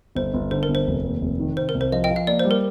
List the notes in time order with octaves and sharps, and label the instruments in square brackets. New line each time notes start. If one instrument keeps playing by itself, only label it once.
[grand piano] G1 [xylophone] C5
[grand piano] G1
[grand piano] D3 [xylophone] C5
[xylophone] A#4
[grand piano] G1
[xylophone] C5
[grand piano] F1
D#2
F1
D#3
[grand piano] C3 [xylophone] C5
[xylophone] A#4
[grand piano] C2
[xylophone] C5
[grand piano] F3 [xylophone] D#5
[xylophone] D#5 G5
[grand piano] F3
[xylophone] F5
[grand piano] A#3 [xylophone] D5
[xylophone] C5
[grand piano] G3
[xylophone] A#4